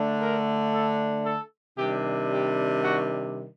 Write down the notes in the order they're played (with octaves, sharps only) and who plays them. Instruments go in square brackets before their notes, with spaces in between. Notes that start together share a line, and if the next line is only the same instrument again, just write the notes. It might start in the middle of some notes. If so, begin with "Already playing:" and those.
Already playing: [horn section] D3 A3 D4
A#4
A4
A4
C3 D#3 G3 D4 G4
G4
F#4